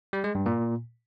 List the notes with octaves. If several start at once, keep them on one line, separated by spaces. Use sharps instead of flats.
G3
G#3
G2
A#2